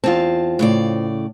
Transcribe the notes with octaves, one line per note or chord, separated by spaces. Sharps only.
E2 C4 F4 A5
A2 C#3 D5